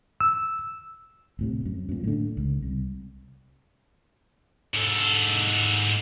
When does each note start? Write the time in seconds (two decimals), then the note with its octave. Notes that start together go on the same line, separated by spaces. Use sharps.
0.21 E6
1.39 D1 A2 C3
1.65 F#2
1.89 F#2 A#2
2.04 A2 D3
2.37 C#2
2.62 C2
4.74 G#2 A4